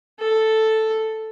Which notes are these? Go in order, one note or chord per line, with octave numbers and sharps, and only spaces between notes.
A4